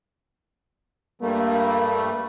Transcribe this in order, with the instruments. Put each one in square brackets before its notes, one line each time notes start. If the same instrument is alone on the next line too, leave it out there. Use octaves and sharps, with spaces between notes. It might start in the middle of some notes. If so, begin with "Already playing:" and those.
[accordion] G2 G3 A3 [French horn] A#3